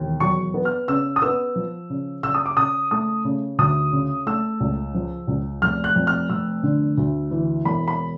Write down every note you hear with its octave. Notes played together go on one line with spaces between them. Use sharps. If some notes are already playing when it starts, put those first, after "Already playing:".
Already playing: E1 D#2
F#3 C#6
B3
F6
C#3 E6
D#6
B3 E6
F3
C#3
C#3 E6
D#6
D6
C#3 D#6
A3 D#6
C#3
D2 D#6
C#3
A3 E6
C#2
F3
C#2
F1 F6
F#6
F2
F6
F1 E6
D3
D2
E3
E1 B5
B5